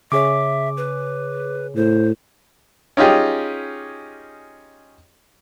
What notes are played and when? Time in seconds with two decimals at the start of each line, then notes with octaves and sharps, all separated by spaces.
0.12 C#3 G#4 C#5 E5 D6
0.77 B4
1.76 A2 C5
2.97 C#4 D#4 F4 G4 G#4